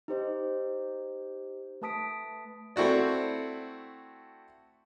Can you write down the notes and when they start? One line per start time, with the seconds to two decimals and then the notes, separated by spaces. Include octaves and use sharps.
0.08 D#4 G4 C5 D#5
1.82 A3 B4 A5 D#6 B6 D7
2.76 A3 C4 E4 F#4 D5